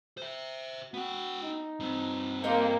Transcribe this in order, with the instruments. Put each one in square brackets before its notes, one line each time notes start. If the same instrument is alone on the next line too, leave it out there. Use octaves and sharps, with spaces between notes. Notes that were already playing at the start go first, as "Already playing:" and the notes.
[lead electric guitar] C5 E5
[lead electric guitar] B3 G5 [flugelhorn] F#4
[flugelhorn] D#4
[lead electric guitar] G2 C4
[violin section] A#3 [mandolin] D#4 F4 G4